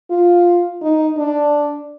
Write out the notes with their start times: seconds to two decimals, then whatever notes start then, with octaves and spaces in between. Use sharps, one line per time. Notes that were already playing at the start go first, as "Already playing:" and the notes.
0.10 F4
0.82 D#4
1.17 D4